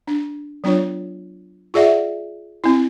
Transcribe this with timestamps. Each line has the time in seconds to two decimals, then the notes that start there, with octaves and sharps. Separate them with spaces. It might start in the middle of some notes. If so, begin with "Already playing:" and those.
0.07 D4
0.64 F#3 B3 D4 F4 C#5
1.74 F4 G#4 D5 E5 F#5
2.64 C4 E4